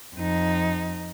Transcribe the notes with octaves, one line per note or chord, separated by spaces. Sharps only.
F2 D#4